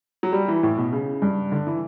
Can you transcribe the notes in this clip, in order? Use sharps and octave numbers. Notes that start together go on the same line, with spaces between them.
F#3
G3
E3
A2
B2
C#3
G2
D3
E3